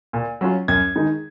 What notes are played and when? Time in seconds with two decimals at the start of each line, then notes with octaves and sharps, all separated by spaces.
0.13 A#2
0.41 F#3 C#4 F4
0.68 F#2 G#6
0.96 D#3 G#3 D#4